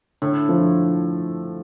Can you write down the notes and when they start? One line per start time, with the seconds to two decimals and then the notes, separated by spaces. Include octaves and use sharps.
0.22 A2 D3
0.49 F3